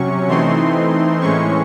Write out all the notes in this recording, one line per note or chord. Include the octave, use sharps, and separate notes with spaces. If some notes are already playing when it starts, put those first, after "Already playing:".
Already playing: C3 F#3 C#4 C#6
E3 A3 C4 D#4 C6
A2 E3 G#3 C#4 C#6